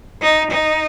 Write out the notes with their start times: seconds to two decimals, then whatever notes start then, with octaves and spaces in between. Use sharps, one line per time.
0.22 D#4
0.50 D#4